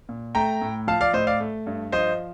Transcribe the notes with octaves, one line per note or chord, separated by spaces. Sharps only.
A#2
A3 G5 A#5
A2
F3 F5 A5
D5 F5
A2 C5 D#5
D5 F5
A3
G2
F3 C5 D#5